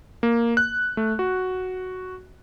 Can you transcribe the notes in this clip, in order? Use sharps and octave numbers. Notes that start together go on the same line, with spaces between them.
A#3
F#6
A3
F#4